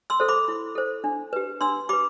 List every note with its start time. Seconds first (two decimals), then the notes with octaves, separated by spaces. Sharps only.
0.10 C6 E6
0.20 A4 C5
0.28 B5 D6
0.48 E4
0.75 A4 C5
1.04 D4
1.33 G4 B4
1.61 D4 C6 E6
1.89 G4 B4 B5 D6